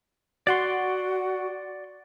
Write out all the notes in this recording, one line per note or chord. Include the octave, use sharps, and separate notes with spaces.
F#4 D5 F#5 C6